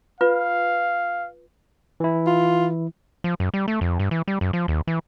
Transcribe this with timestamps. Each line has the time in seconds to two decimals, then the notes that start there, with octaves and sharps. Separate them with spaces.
0.21 F4 B4 F5
2.00 E3 E4
2.27 F4
3.24 F3
3.40 F#2
3.54 G3
3.68 A3
3.81 F2
3.99 G2
4.11 E3
4.28 G3
4.41 F#2
4.53 F3
4.68 D#2
4.87 E3